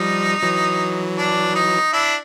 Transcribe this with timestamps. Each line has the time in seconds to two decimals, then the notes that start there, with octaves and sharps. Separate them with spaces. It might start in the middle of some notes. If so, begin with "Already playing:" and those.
Already playing: F3 G3 D#4
0.42 E3 F#3
1.18 D4
1.55 D#4
1.93 D4 E4